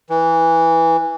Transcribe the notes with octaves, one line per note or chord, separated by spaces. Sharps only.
E3